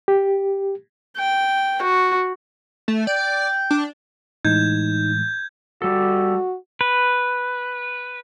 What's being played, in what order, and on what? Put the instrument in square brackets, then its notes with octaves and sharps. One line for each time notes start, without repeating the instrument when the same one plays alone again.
[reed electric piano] G4
[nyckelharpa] G5
F#4
[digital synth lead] A3
[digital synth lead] D5 [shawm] G5
[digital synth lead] D4
[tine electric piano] A2 E3 G#3 [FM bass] D#4 [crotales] G6 G#6
[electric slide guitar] G3 A4 [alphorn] F#4
[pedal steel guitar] B4